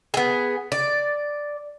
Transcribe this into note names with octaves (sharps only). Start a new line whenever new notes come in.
B3 G#4
D5